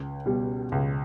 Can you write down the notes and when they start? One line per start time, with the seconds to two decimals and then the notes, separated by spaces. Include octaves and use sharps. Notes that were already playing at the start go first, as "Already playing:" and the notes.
Already playing: C#2
0.26 B2 G3
0.72 C#2